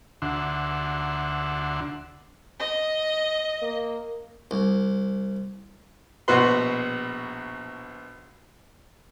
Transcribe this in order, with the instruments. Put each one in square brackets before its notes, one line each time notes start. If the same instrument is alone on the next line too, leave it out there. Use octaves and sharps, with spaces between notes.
[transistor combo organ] D2 D3 E5 F#5 C6
[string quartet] D#5
[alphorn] A#3
[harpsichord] C2
[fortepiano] A#1 B2 F#4 B4 C6